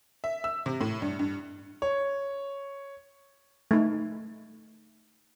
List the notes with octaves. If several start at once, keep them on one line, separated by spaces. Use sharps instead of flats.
E5
E6
C3
A2
G2
G2
C#5
A3 D#4